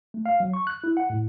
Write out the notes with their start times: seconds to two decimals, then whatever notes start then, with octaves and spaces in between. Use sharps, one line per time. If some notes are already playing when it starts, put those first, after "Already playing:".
0.14 A3
0.26 F5
0.40 F#3
0.54 C#6
0.67 F#6
0.84 E4
0.97 F#5
1.10 A2